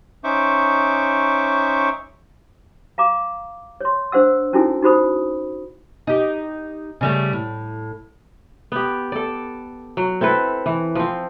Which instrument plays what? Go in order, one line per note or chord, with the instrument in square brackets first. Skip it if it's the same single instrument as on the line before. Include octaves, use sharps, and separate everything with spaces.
[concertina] C#4 D#4 C5 E5 C#6 D6
[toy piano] F5 A#5 D6
C#5 C6
D4 C5 F#5 E6
C#4 D#4 E4 F#4 A4 G#5
D#4 F#4 C5 B5 D#6
[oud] D#4 G4
C#3 G3 A3
A2
[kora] B3 G4
A4 D5
F#3
C4 E4 A4 B4
E3
F3 C4